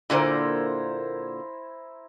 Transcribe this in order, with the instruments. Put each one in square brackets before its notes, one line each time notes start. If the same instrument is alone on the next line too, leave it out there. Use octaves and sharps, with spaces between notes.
[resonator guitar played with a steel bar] A#2 D3 A#3 [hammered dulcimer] E4 C5 A#5